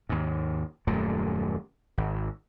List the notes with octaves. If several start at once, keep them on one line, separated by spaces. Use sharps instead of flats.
D#2 G#2
D#1 F#2 A#2 A3
G#1